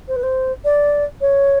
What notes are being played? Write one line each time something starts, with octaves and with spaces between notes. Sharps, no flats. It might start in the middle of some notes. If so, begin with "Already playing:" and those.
C5
B4
C5
D5
C#5